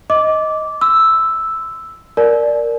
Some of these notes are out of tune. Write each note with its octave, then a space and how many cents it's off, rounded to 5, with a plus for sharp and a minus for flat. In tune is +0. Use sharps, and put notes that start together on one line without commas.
D#5 +10 D6 -10
C6 -25 E6 +0
A#4 +0 D5 +0 G#5 +45